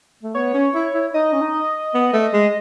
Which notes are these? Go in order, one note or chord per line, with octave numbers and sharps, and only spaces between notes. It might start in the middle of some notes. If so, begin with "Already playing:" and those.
A3
B3 C#5
C#4
E4
E4
D#4 D#5
C#4
D#4
B3
A3
G#3